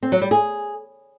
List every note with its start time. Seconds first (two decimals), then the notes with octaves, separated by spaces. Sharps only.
0.03 C4
0.12 F#3
0.22 G3
0.31 G#4